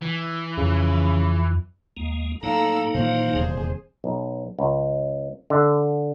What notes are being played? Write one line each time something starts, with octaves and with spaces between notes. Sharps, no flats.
E3
F2 C#3
D#2 G#3 A#3
A2 F#3 A#3 D#4 A4 F5 A#5 E6
A#2 D#3 E3 C5 F5
D#1 E2 C3 G#4
B1
C#2
D3